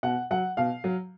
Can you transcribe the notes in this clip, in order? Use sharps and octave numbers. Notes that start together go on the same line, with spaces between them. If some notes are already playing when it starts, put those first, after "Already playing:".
B2 F#5
F#3 F#5
B2 F5
F#3